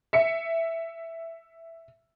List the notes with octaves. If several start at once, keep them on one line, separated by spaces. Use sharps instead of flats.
E5 C#7